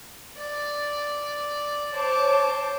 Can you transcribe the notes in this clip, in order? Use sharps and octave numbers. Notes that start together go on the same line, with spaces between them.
D5
C5 C#5 A5 D6